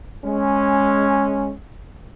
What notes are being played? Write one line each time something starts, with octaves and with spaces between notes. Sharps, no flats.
G#3 C#4